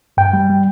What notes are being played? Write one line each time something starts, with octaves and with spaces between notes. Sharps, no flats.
G2 G5
G3
G3